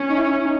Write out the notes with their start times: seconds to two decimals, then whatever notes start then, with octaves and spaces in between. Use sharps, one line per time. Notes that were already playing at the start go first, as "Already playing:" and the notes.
Already playing: C#4
0.09 D#4
0.17 E4
0.43 D#4